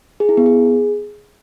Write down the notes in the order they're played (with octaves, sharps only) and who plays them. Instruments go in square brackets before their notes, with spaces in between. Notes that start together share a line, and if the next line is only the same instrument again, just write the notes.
[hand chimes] G#4
E4
B3
G#4